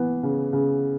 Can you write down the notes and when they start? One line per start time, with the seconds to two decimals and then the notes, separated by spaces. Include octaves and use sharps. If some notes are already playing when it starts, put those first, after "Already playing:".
Already playing: E3 B3
0.23 C#3
0.53 C#3